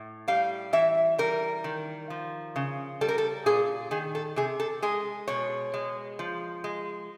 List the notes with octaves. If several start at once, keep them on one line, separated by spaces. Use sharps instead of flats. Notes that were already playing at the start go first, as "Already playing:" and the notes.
Already playing: A2
G3 F5
E3 E5
G3 A#4
D#3
F3
C#3
G3 A4
A#4
A4
A#2 G#4
D#3 G#4
A4
C3 G#4
A4
G#3 G#4
B2 C#5
G#3
F3
G#3